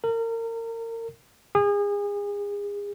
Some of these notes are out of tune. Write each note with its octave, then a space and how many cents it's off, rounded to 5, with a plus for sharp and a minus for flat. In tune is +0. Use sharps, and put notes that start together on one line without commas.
A#4 -30
G#4 -30